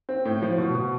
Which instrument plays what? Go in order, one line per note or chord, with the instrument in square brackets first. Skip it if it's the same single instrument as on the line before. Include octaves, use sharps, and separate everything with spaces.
[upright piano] C4
A2
F3
B2
B2